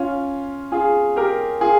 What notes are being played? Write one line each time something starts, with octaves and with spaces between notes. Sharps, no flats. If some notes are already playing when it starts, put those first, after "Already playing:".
Already playing: C#4 F4
F4 G#4
G4 A#4
F4 G#4